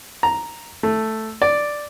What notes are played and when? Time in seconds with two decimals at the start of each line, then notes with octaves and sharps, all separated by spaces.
0.23 A#5
0.83 A3
1.42 D5